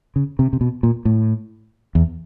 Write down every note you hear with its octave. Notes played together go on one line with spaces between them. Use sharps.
C#3
C3
C3
B2
A#2
A2
E2